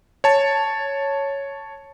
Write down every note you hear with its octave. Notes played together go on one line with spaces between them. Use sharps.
C#5 A5